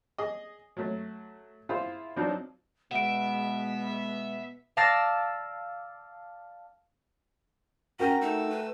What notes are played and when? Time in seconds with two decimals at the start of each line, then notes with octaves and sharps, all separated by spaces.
0.18 G#4 D#5
0.77 F#3 A3
1.69 E4 F4 G#4 C5
2.16 F3 F#3 C4 D4 D#4
2.91 B2 G#3 B3 E5 F#5 D7
4.77 D5 F5 A5 E6 A6 A#6
7.99 C#4 F#4 A#4 G5 A#5
8.21 A3 D#4 E6
8.50 B4